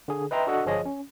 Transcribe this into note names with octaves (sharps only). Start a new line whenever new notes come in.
D3 G#4
B4 D#5 E5 G5 A#5 C6
D4 F#4 A4 D#5 F#5
G1 F3 F4 G#4 C#5 D#5
C#4